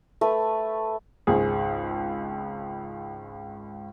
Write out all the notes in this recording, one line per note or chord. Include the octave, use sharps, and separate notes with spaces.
A3 B4
G#1 C#2 G#4